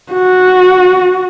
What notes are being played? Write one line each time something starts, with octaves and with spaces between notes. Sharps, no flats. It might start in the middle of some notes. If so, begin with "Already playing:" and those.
F#4